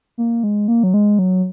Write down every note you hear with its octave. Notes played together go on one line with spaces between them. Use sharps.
A#3
G#3
A#3
F#3
G#3
F#3